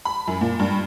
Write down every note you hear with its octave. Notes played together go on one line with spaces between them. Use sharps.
B5
F#2
A#2
G2